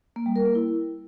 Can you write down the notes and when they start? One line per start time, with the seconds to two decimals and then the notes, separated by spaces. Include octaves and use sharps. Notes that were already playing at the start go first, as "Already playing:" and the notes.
0.16 A#3
0.26 G3
0.36 A#4
0.45 A#3
0.55 E4